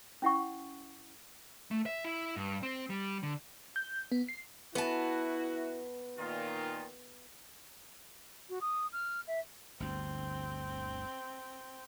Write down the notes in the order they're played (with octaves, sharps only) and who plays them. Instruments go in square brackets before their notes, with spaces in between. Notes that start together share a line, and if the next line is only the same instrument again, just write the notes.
[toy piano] C#4 E4 F#5 C#6
[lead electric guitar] A3
E5
E4
G2
C4
G3
D3
[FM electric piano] G6
B3
C7
[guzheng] B3 A5 [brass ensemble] E4 F#4
[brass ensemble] A#2 D#3 F4
[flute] F#4
D#6
F6
E5
[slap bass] G1 D2 [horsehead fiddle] C4